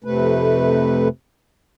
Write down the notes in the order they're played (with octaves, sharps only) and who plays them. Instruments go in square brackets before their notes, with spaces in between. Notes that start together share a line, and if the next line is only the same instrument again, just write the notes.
[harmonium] F2 C3 A3 B4